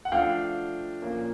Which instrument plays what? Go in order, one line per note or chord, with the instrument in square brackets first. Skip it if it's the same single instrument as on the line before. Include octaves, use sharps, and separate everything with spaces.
[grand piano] F#5
F3 A3 D4 F5 G5
A#2 F3 A#3 C#4